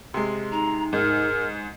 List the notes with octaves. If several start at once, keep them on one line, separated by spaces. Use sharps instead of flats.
C3 G#3
D#4 A#5
G#2 A#4